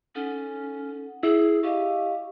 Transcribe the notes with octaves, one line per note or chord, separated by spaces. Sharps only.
C#4 D#4 A4 F#5
E4 G#4
G4 D#5 F5 C#6